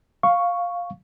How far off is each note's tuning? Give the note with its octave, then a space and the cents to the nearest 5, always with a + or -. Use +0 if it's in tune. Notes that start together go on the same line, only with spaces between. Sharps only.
F5 +5 C#6 +0